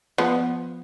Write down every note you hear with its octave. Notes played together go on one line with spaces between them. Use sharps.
F3 B3